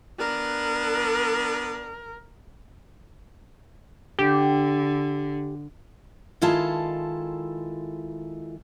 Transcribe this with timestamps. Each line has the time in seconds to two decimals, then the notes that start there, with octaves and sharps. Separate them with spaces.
0.20 B3 D4 A#4
4.19 D3 G4
6.41 D#3 G#3 E4 F4 A4 A5